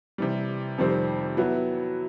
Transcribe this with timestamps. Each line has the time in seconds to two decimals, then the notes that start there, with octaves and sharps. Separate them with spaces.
0.18 C3 E3 G3
0.78 F2 C3 D#3 G3 C4
1.37 F#3 B3 E4